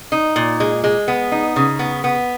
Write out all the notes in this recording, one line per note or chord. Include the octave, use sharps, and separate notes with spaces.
D#4
A#2
G#3
G#3
B3
D#4
C#3
B3
B3